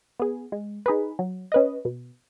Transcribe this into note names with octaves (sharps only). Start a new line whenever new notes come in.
B3 G#4
G#3
D#4 G#4 B4
F#3
C#4 B4 D#5
B2